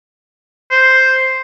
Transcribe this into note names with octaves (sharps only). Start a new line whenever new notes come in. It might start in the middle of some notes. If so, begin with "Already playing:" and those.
C5